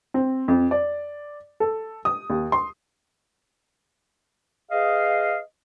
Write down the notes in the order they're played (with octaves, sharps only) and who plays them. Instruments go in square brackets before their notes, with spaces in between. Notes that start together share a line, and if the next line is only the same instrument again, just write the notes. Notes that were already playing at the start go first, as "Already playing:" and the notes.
[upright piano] C4
F2
D5
A4
D#6
D#2
C6
[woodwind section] G#4 B4 D#5 F5